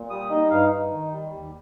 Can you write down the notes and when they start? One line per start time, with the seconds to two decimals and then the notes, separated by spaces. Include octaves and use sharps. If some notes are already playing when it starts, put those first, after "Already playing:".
Already playing: A#2
0.10 G3 D#6
0.30 D#4 D#5
0.50 G2 F5
0.71 D#4
0.92 D#3
1.12 G3
1.33 D#2